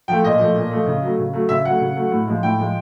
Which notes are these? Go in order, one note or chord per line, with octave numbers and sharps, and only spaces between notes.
F3 A3 G5
A#2 D#5
F3 A3
A#2
F3 A3
C#3
F#3 A3
C#3
F#3 A3
C#3 E5
F#3 A3 F#5
C#3
F#3 A3
A2
F3 G#3
A2 G5
F3 G#3